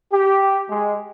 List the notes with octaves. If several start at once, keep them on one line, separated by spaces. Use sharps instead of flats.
G4
G#3